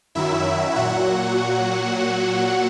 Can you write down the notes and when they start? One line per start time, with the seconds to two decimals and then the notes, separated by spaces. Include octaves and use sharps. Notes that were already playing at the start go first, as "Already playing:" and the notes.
0.15 F#2 D#3 F#3 E4 E5
0.76 A#2 F#3 F#4 F#5